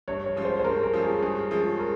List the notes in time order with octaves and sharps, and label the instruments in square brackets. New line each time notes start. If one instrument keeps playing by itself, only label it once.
[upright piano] G2 [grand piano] C#5
[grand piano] C#5
[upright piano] F3 G#3 C#4 F4
[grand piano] C5
C5
[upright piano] G2 [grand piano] A#4
[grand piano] A#4
[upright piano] F3 G#3 C#4 F4
[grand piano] G#4
[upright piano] G2 [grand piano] G#4
[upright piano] F3 G#3 C#4 F4 [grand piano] G#4
[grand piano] A#4